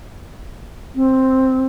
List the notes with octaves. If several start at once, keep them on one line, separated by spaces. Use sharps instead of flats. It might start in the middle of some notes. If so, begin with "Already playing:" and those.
C4